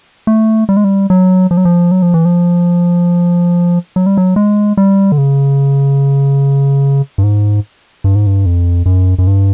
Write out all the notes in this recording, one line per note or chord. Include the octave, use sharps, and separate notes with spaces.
A3
G3
G#3
G3
F#3
F3
F#3
F3
F#3
F3
E3
F3
F#3
G3
F#3
G#3
G3
D3
C#3
G2
G#2
G2
G#2
G2
F2
F#2
F#2
G2